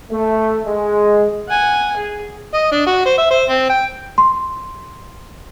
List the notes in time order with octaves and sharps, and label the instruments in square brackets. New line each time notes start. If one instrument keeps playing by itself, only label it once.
[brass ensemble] A3
G#3
[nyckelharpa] F#5 G#5
G#4
[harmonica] D#5
D4
F#4
C5
E5
C5
C4
G5
[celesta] C6